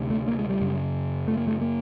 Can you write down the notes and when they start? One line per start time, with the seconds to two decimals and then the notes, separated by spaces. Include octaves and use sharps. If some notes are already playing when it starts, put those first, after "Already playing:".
Already playing: D2 C3
0.10 A3
0.28 A#3
0.39 G#3
0.49 G3
0.61 F#2 C#3
1.28 A3
1.37 A#3
1.47 A3
1.61 A#3